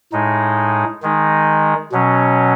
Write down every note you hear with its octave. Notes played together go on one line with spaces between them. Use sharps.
A2 G#3 D#4
D#3 G#3 D#4
B2 F#3 C#4